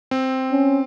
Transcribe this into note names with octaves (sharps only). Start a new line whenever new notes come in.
C4
C#4